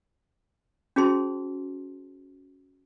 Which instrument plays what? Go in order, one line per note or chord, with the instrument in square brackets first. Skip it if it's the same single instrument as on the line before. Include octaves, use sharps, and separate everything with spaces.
[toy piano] C#4 F#4 G#4 C5 A5 C6